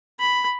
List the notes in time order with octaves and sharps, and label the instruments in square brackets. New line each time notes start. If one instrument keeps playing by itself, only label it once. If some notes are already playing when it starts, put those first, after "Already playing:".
[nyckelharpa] B5